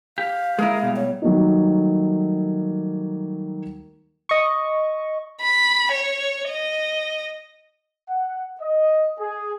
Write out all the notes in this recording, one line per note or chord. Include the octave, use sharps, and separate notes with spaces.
G4 F5
G#3 A#3 E4 G#4 A#4
B2 G3
C#5
D#3 F#3 G3 A3 A#3 D#4
D#5 C#6
B5
C#5
D#5
F#5
D#5
G#4